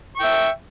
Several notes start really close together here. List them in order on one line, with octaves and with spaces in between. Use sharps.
C#6 G5 E5